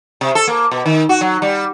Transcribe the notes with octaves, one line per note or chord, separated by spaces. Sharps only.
C3
A4
A#3
B2
D#3
F#4
F#3
G3